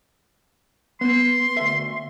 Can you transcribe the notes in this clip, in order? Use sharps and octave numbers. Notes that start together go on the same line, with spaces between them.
B3 C6
D2 E5